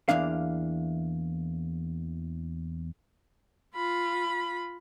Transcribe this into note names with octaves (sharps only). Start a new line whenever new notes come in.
E2 G2 E3 A#3 D4 F5
F4 B5